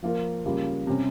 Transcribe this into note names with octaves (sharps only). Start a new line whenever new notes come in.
F3 A#3 F4 A#4
C#3 G3 A#3 F4
C3 G3 C#4